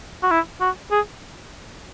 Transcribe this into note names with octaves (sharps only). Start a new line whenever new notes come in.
F#4
E4
F#4
G#4